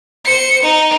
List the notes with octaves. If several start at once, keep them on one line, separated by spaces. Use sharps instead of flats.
C5 C#7
D#4